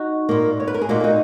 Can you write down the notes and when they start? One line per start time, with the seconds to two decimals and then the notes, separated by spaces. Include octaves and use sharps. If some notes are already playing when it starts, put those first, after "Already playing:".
Already playing: D#4 F#4
0.29 A#2 A#3
0.60 C#5
0.67 B4
0.74 A#4
0.81 G#4
0.89 A#2 A#3 D#4 F#4
1.00 G#4
1.04 D#4 F#4